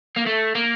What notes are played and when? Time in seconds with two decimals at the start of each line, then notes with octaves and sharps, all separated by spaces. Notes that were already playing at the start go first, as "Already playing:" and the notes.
0.16 A#3
0.27 A3
0.55 A#3